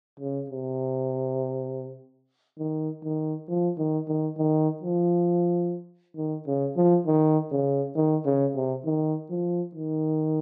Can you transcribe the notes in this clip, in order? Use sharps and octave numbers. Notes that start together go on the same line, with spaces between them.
C#3
C3
D#3
D#3
F3
D#3
D#3
D#3
F3
D#3
C#3
F3
D#3
C#3
D#3
C#3
C3
D#3
F3
D#3